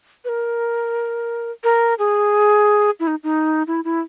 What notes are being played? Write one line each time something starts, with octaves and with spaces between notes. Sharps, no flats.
B4
A#4
A#4
G#4
E4
D#4
D#4
E4
E4